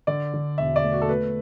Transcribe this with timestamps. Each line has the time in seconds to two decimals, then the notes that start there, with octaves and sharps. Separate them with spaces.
0.07 D3 D5
0.34 D3
0.58 E1 E5
0.76 D5
0.84 A3
0.92 F#4
1.02 A4
1.09 A3 B4